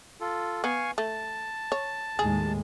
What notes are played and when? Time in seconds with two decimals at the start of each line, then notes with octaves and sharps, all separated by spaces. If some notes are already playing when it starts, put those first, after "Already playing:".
0.20 F4 A4
0.64 B3 F5 G#5 C#6
0.98 A3 A5
1.72 C#5
2.19 D#2 A2 G#3 G#4